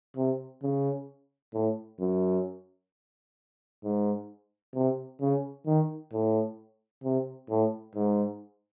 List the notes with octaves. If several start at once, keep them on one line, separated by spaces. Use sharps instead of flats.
C3
C#3
A2
F#2
G#2
C3
C#3
D#3
A2
C3
A2
G#2